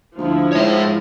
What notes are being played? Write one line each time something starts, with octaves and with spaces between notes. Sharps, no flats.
D2 F3 E4
G#2 C#5 E5